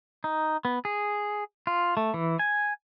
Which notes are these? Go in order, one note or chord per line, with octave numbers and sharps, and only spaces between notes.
D#4
B3
G#4
F4
A3
E3
G#5